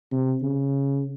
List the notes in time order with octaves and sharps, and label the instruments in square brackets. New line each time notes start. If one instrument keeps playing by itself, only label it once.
[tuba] C3
C#3